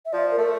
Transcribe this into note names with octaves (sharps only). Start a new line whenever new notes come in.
E5
F3 D5
A#4
A3